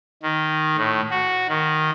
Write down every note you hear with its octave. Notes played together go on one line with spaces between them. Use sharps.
D#3
A2
F#4
D#3